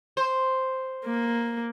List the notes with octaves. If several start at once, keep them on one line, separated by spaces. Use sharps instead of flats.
C5
A#3